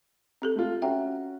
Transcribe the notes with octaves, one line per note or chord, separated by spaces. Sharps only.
C4 G4 A4
A3 F4
C#4 F#4 E5 G5 A#5